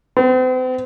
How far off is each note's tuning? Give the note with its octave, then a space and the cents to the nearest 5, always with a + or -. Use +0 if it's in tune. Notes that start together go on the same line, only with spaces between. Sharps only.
C4 -40